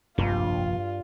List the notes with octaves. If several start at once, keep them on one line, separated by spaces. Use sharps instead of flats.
F1 A#1 G2 F4